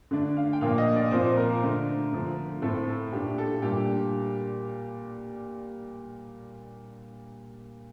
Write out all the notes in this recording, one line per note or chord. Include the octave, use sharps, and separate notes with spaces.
D3 A3 D4
F5
G5
A#2 F3 A#3 D4 F5
D#5
D5
A#2 F3 C4 C5
A#4
D3 A3 D4
D3 F3 A3
A2 A3 C4 A4
A4
A#2 A3 D4 G4
A4
A#2 G3 D4 G4